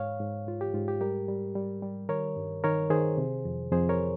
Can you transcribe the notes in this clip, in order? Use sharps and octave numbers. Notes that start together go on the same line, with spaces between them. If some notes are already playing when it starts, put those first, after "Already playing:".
Already playing: G#2 C#5 F5
G#2
G#2 F4
G4
G#2 F4
G4
G3 G4 A#4
G3
G3
G3
D#3 A#4 C#5
G2
D#3 A#4 C#5
D#3 G#4 C5
C3
F2
F2 G#4 C5
A#4 C#5